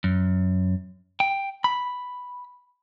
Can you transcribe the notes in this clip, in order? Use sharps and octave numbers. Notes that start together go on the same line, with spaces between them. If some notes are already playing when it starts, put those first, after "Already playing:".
F#2
G5
B5